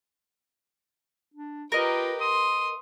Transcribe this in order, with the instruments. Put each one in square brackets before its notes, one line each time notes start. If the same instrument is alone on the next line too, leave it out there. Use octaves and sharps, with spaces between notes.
[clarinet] D4
[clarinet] F4 [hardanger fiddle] G4 B4 [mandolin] A#4 D#5
[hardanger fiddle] C6 [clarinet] D#6